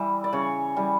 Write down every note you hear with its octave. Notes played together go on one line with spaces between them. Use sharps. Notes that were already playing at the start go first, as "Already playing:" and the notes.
Already playing: E3 G3 E5
D5
C#3 C#5
E3 G3